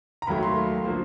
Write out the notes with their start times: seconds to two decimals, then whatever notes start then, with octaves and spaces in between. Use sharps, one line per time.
0.22 A#5
0.27 D#2 D#3 F#3 A3 B5
0.43 C6
0.85 D3 F3 A#3